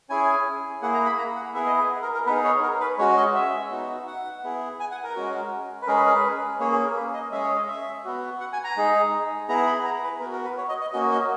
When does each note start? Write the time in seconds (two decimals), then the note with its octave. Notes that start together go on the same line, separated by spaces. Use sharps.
0.10 C#4 E4 G#4 G#5
0.82 A#3 E4 G#4 F#5
0.94 A#5
1.06 B5
1.18 A#5
1.36 F#5
1.54 B3 E4 G#4 E5
1.66 D#5
1.78 B4
2.02 A#4
2.14 A#4
2.26 B3 D#4 G#4 B4
2.44 C#5
2.62 A#4
2.81 B4
2.99 G#3 C#4 F#4 C#5
3.17 D#5
3.35 E5
3.71 B3 D#4 F#4
4.07 F#5
4.43 B3 E4 G#4
4.80 G#5
4.91 F#5
5.03 A#4
5.15 G#3 C#4 F#4
5.82 B4
5.87 G#3 C#4 G#4 A#4
5.97 B4
6.06 A#4
6.14 B4
6.60 A#3 C#4 G#4 C#5
6.72 G#4
6.84 A#4
6.96 B4
7.13 D#5
7.32 G#3 C#4 G#4 E5
7.44 C#5
7.56 D#5
7.68 E5
8.05 B3 F#4
8.40 F#5
8.53 G#5
8.64 A#5
8.77 G#3 D#4 G#4
9.49 B3 E4 G#4 A#5
9.66 B5
9.85 A#5
10.03 B4
10.21 B3 A#4
10.25 F#4
10.32 A#4
10.45 B4
10.57 C#5
10.69 D#5
10.81 D#5
10.93 A#3 C#4 F#4 D#5
11.11 D#5